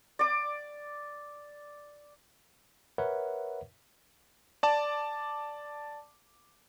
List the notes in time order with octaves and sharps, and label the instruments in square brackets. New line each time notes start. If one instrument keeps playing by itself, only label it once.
[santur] D5 D6
[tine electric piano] A#4 B4 C#5 E5 F#5
[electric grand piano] D5 A5 D6